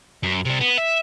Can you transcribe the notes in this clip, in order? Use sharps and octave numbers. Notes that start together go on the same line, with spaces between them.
F#2
C3 G3
B3
E5